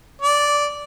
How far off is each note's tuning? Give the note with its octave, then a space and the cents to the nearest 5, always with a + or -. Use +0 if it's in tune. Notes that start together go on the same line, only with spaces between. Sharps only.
D5 -10